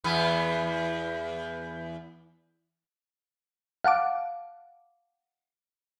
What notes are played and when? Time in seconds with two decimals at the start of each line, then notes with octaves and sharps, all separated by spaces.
0.04 E2 B3
3.84 F5 F#5 A5 D6